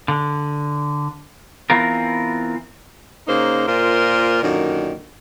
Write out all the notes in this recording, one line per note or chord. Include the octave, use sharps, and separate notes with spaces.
D3
E3 B3 C4 F4 A#4
C#3 A#3 D#4 C5
A#2 F4 A#4 C5
F#2 A#2 D3 D#3